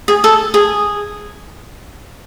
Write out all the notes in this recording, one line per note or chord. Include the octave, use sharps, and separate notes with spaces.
G#4
A4
G#4